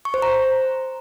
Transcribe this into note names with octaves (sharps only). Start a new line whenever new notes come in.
C#6
C5
A#5